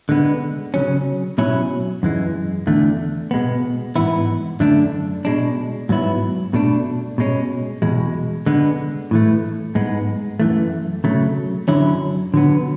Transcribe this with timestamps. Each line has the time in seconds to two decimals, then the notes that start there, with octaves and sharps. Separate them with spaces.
0.09 D3 G#3 B3
0.74 C#3 F#3 C#4
1.38 B2 F#3 C#4 E4
2.03 F#2 E3 G#3
2.67 E2 D3 A3
3.31 B2 G#3 B3
3.96 G#2 E3 B3 E4
4.60 F#2 D3 A3 D4
5.25 B2 G#3 D4
5.89 G#2 F#3 B3 E4
6.54 B2 A3 D4
7.18 B2 G#3 C#4
7.82 E2 B2 G#3
8.46 D3 G#3 B3
9.11 A2 E3 A3
9.75 G#2 G#3 B3
10.40 F#2 E3 A3
11.04 C#3 F#3 A3
11.68 F#2 D3 F#3 C#4 E4
12.34 D3 F#3 B3